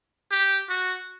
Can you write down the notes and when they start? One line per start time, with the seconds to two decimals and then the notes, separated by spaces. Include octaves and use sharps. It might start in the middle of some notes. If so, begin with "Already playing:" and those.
0.31 G4
0.69 F#4